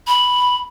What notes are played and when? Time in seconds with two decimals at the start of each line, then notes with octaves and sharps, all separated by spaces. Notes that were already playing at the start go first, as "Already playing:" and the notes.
0.07 B5